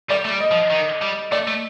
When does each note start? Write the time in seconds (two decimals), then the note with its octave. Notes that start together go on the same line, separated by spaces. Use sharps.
0.10 G3 D5
0.25 A3
0.31 G3
0.40 D#5
0.51 F3
0.70 D#3
1.02 G3
1.32 A3 D5
1.47 A3